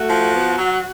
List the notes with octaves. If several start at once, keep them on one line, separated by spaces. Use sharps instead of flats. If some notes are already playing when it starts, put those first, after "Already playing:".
Already playing: A3 F#4
F3
B3
F#3